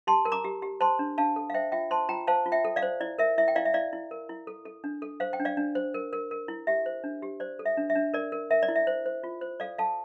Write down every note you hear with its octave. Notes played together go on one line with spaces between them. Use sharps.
G4 A5 C6
A#4
A#5 D6
G4
G4
C5 A5 C6
D4
D4 F5 A5
A4
F5
C5 E5 G5
F4 E5 G5
C5 A5 C6
F4 G5 A#5
C5 F5 A5
F4
E5 G5
A4
D5 F5
C5
E4 D5
A#4 E5
E4 E5
G5
E4 D5 F5
E5
E4 D5 F5
E4
A#4
E4
A4
A4
D4
A4
C5 F5
G5
D4
D5 F5
D4
C5
A#4
A#4
A#4
E4
G4 E5
C5
D4
G4
C5 D5
A4
E5
D4
E5
D4
A#4 D5
A#4
A#4 E5
D5
E4
E5
C5
C5
F4
C5
A4 D5 F5
A4 F5 A5